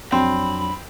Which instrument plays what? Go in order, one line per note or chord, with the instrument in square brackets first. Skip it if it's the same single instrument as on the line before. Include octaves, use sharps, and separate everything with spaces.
[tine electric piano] F2 F#3 D4 [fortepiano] C4 [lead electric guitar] B5